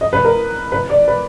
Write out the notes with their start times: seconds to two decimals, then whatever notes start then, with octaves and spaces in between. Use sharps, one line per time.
0.01 D#5
0.13 B4
0.24 A#4
0.72 B4
0.90 D5
1.08 B4